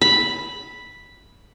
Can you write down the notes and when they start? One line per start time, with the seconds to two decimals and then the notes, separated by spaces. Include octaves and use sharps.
0.01 B5